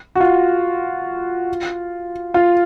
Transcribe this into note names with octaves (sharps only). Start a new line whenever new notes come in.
F#4
F4
F4